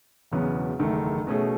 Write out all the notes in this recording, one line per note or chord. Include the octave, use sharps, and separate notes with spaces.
E1 E2 C#3 F#3 B3
F#1 E2 D#3 A3
B2 A3 C#4 G#4